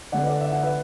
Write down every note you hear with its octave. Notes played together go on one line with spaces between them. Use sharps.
D3 A3 D5 F#5
B4
A4 D5
E5
F#5
B4 E5